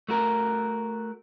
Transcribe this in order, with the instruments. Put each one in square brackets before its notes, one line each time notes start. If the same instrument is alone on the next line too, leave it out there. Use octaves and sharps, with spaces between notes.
[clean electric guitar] A3 F#4 A#4